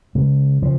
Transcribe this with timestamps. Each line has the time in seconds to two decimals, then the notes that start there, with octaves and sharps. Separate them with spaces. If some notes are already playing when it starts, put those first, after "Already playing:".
0.15 C#3 G#3
0.62 C#3 F3